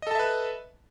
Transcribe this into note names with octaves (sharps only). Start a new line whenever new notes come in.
A4 B4 D#5 E5 A5